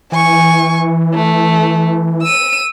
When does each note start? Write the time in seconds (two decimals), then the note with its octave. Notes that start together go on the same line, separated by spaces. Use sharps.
0.12 E3 G#5 C#6
1.14 A3
2.22 E6 D#7